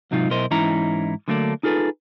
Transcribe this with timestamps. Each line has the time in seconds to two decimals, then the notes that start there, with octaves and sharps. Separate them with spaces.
0.11 G#2 C3 F#3 D#4 F4
0.29 B1 B2 E4 A#4 C5 D#5
0.51 G#2 E3 C#4 D#4 E4 A#5
1.28 D3 F#3 A3 A#3 C4 D4
1.63 D#4 F4 G#4 A4 B4